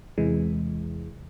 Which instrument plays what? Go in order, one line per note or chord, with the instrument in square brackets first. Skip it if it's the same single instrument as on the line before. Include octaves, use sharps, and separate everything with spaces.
[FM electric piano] E2 C3 E3 G#3